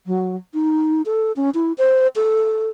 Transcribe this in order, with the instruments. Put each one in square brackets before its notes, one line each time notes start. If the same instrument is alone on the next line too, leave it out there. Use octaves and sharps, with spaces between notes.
[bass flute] F#3
D#4
A4
C#4
E4
C5
A4